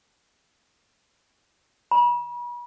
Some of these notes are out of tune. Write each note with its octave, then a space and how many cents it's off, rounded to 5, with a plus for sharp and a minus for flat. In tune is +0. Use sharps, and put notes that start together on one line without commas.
B5 -40